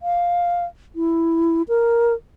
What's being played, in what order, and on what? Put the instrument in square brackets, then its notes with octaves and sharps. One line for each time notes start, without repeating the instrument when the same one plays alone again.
[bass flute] F5
E4
A#4